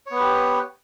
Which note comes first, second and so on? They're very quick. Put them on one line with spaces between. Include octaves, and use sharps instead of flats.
C#5 B3 B4 G4